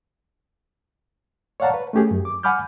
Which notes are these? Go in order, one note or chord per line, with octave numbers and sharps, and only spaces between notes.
C#5 D5 F5 F#5 A5 A#5
B4
A3 C#4 G4 G#4
F#2
D6
F#5 G#5 B5 D6 F6 G6